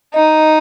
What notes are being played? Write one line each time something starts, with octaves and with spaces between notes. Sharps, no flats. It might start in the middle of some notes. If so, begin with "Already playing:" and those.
D#4 D#5